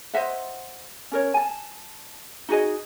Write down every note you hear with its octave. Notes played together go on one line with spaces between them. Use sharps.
C5 D#5 E5 F#5
C#4 A#4 C#5
G#5 A5
D#4 F#4 G#4 D#5